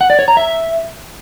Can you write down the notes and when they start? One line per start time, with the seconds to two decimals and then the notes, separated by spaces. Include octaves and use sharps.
0.01 F#5
0.10 D5
0.19 C#5
0.28 A#5
0.37 E5